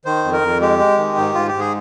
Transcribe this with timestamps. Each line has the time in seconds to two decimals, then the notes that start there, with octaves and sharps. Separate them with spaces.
0.05 D#3 C5
0.24 F2
0.33 A#4
0.42 F2
0.61 G#3 G4
0.79 G#3
0.98 D#3
1.17 G#2
1.34 G#2 F4
1.48 G4
1.54 G#2
1.60 G#4